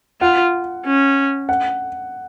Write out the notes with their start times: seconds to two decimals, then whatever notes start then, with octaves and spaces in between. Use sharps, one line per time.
0.21 F4 F#5
0.86 C#4
1.49 F#5